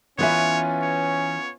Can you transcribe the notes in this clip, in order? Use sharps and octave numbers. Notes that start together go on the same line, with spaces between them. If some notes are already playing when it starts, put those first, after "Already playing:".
E3 B3 C#4 F4 B4 C#5 E5 G#5
C#5